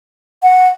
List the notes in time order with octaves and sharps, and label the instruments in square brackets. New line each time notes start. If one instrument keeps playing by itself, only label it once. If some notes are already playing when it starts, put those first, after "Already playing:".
[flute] F#5